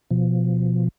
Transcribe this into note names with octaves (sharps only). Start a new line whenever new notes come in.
B2 F3